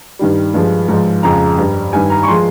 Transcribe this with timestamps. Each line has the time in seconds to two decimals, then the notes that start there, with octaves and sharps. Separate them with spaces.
0.19 G2 D#3 G3
0.54 G2 F3 G#3
0.88 G#2 F3 G#3
1.23 F2 C#3 F3 G#3 A#5
1.58 G2 G3
1.92 G2 D#3 G3 G#5
2.10 A#5
2.23 C#6
2.28 F3 G#3 C6